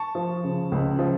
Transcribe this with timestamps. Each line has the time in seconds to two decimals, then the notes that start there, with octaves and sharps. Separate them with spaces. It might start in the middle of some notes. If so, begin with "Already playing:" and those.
Already playing: A5 C#6
0.15 F3
0.44 C#3
0.72 C#2
0.99 F3